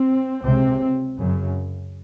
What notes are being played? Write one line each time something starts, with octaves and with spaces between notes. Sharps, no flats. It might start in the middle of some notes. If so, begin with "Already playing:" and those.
Already playing: C4
C#2 C3 C4
F#2 C#3